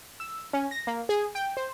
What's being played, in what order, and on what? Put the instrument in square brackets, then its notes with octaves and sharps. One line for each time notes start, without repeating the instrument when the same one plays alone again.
[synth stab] E6
C#4
A#6
A#3
G#4
G5
C5